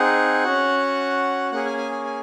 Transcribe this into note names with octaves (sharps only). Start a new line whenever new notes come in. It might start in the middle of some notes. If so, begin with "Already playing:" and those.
Already playing: C4 D#4 G#4 F#5
C#4 F#4
A#3 C#4 G#4 F#5
G#5
G#5
G#5
G#5